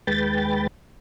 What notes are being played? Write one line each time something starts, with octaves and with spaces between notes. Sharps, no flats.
D#2 G#3 B4 G5 A6